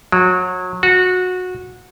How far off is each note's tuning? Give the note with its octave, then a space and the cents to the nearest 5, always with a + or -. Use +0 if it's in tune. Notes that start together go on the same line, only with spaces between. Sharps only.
F#3 -25
F#4 -20